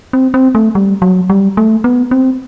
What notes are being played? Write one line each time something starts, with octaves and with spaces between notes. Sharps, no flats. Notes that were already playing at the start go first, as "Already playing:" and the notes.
C4
C4
A3
G3
F#3
G3
A3
B3
C4